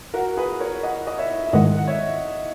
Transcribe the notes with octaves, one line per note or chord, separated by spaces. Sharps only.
F#4 A#4
G#4 B4
A#4 C#5
D#5 F#5
D#5
C#5 E5
E5
G#2 D#3 G#3 D#5 F#5
F#5
C#5 E5